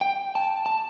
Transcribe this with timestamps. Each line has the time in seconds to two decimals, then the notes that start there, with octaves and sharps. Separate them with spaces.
0.01 G5
0.35 A5
0.66 A5